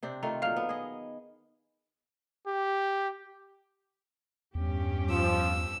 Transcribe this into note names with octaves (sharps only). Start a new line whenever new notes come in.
C3 C4 D4
D#3 A3 F4 A#5
A#2 F#3 F5 F6 F7
B3
G#4 D#5
G4
E2 G2 C#4 G4
F3 E6